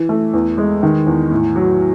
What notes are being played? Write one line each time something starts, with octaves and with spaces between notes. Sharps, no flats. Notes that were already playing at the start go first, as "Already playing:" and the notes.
Already playing: E3
A3
E2
G#3
D#3
E2
A2
F#3